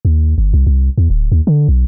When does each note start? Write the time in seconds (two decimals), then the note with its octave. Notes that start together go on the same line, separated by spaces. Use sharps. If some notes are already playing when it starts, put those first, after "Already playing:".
0.05 D#2
0.38 G1
0.54 C2
0.67 C2
0.98 E2
1.10 D1
1.32 D#2
1.47 D3
1.69 B1